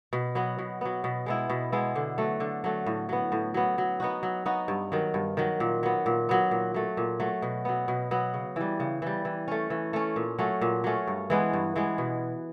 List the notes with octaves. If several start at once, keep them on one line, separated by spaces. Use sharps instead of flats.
B2
F#3 B3
B2
F#3 B3
B2
G#3 B3 E4
B2
G#3 B3 E4
D3
F#3 A3
D3
F#3 A3
A2
F#3 B3
A2
F#3 B3
F#3
B3 D#4 F#4
F#3
B3 D#4 F#4
G2
D#3 F#3
G2
D#3 F#3
A#2
F#3 B3
A#2
F#3 B3
A#2
F#3 A3
A#2
F#3 A3
B2
F#3 B3
B2
F#3 B3
C#3
E3 G3
C#3
E3 G3
E3
A3 C#4
E3
A3 C#4
A#2
F#3 A3 C#4
A#2
F#3 A3 C#4
G2
E3 G#3 B3
G2
E3 G#3 B3
B2